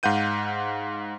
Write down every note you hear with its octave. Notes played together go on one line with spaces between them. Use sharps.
G#2 F5 F#5 G6 D#7